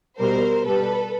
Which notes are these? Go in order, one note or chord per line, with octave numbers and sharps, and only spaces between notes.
B2 G3 A#4 C5
B2 G3 A4 B4